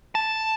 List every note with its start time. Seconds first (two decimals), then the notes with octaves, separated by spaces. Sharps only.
0.15 A5